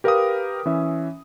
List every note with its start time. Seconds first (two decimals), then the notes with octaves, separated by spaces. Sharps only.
0.04 G4 A#4 B4 F5 G5 D#6
0.66 E3 C#4 E5